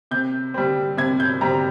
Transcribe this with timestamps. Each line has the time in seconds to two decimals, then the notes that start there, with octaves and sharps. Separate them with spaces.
0.11 C3 G6
0.54 G3 C4
0.97 C3 G#6
1.20 G6
1.41 G3 C4 A#5